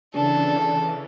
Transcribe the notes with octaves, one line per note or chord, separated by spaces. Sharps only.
C#3 E3 D4 A4